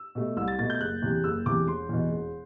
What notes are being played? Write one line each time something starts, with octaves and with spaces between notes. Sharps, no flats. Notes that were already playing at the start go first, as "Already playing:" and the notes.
Already playing: E6
B2 A3
C2 E6
A6
B2 A3 A6
G6
F#1 F#6
E2 C3
F#1 E6
E2 C3 D6
E1 C6
E2 B2
E1